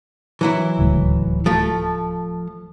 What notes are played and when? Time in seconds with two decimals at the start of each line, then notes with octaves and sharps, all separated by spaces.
0.41 E3 F#3 E4
0.79 D1 C#2 A2
1.46 F3 A3